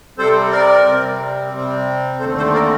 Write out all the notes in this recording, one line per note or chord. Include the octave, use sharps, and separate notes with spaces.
C3 G3 C4 A4 C5
A#4 D5
C3 G3 C4
C3 G3 C4
D#2 D3 A3 C4 A4 C5
A4 C5
A#4 D5